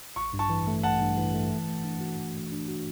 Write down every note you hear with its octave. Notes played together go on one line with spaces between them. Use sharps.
A1 C#6
G2
A5 C#6
E3
A3
A1 F#5 A5
G2
E3
A3
E3
A3
D4
F#4
E3
A3
D4
F#4